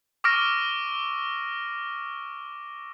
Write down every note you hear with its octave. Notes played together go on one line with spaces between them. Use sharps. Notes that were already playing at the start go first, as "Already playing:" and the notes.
C#6 D6 E6 F6 A#6 D7